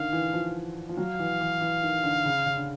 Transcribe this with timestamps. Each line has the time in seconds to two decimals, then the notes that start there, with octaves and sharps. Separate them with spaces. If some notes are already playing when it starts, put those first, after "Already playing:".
Already playing: D3 D#3 F5
0.13 E3
0.34 F3
0.89 F3
0.97 F#3 F5
1.19 E3
1.41 E3
1.61 E3
1.83 D#3
2.03 D3
2.25 C#3
2.46 C#3
2.57 D3